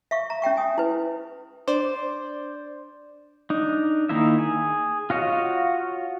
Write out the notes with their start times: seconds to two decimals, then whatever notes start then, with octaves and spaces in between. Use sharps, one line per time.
0.11 E5 F5 C#6
0.30 A#5
0.42 C#4 E5 G5 C#6
0.57 G#5 D#6
0.78 E4 B4
1.68 D4 C5 D5
3.50 D4 D#4
4.09 D#3 A#3 D#4 E4 E5
4.39 G#4
5.10 F4 F#4 C#5 D#5 F5